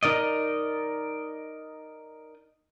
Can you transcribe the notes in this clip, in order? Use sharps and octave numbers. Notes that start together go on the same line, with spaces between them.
D#4 A#4 D5 D#5